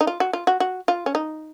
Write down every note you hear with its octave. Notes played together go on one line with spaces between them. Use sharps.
D#4
F4
F#4
F4
F#4
F#4
F4
C#4
D#4